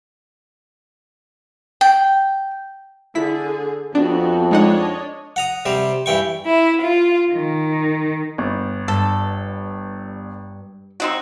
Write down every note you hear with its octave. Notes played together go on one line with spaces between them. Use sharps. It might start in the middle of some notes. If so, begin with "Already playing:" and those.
G5
D3 E4 G#4 B6
F2 B3 C4 D4 F#4
G#3 D4 D#4 C#5 D#5 F#5
F#5 A#5 D#6
C3 G3 C5
G2 E3 G5 C#6
E4
F4
D#3
G1
G2 A4
C4 D#4 F#4